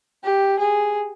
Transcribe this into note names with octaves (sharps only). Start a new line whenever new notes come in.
G4
G#4